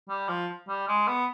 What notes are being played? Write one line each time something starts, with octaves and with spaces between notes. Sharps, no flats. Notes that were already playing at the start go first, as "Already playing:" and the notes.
G3
F3
G3
G#3
B3